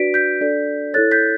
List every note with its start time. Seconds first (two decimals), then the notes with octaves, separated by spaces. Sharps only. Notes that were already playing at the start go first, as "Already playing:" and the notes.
Already playing: D4 F#4 B4 D5 B6 D7
0.14 G6 B6
0.41 D4 A4 D5
0.94 E4 A4 C#5 F#6 A6
1.11 G6 B6